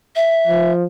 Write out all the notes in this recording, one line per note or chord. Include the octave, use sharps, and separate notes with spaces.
E5
F3